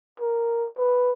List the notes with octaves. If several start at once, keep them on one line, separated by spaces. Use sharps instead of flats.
A#4
B4